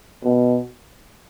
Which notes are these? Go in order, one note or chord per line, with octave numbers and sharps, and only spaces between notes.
B2